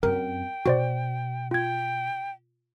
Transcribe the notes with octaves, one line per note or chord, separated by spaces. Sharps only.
F#2 C4 A#4 G5
B2 F#4 C5 D5
F4 G5 G#6